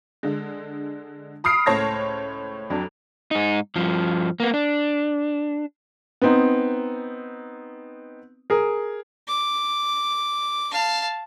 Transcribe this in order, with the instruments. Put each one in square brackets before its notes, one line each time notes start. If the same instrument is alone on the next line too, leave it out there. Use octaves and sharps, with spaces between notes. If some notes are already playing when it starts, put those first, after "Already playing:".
[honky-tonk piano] D3 G#3
B5 D#6 F6 C7 D7
C#2 A2 C5 C#5 A5 A#6
F2 F#3 D4
[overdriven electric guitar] G#2 D#4
G2 F3
A#3 B3
D4
[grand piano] B3 C4 D#4
G#4 A#4
[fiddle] D6
F5 A5